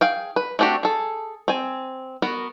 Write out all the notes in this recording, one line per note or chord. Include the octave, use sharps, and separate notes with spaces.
G#4 F5 G5
B4
A3 C4 D4 F#4 G4
G#4 A4
C4 G#5
B3 F#4 A#4